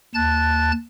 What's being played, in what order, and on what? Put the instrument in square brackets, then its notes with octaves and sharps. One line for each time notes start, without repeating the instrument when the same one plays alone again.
[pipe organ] D#2 A5 F#6 A6